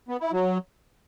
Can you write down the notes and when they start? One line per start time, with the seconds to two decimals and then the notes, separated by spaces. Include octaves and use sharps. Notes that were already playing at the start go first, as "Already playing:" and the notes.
0.09 B3
0.20 E4
0.32 F#3